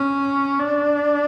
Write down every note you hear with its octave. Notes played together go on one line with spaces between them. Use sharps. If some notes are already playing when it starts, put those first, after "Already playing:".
Already playing: C#4
D4